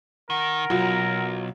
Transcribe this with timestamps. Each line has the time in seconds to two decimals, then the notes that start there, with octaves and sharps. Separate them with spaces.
0.30 D#3 A#4 F#5
0.70 B1 F#3 F4